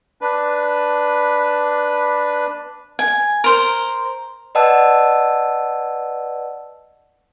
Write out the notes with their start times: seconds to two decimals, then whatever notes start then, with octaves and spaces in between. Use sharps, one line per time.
0.21 D4 B4
2.99 G#5
3.44 A#4 C5
4.55 B4 D5 D#5 F#5 A5 E6